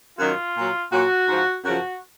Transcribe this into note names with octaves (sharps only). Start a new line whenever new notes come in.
F#2 D#3 F#3 F4
A#2 F#3
A#2 F#3 F#4
G#2 F3
F#2 C#3 F3 F#4